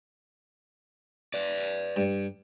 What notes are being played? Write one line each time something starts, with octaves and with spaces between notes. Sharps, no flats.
B4 D5
G2